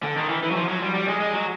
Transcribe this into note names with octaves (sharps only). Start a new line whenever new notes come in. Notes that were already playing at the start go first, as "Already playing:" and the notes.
D3
D#3
E3
E3
F#3
F3
F#3
G3
G3
G#3
G#3
F#3